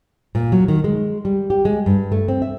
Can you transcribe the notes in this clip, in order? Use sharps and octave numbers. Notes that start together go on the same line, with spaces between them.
A#2
F#3
D#3
G#3
G3
G4
G#3
G2
A3
C4
E5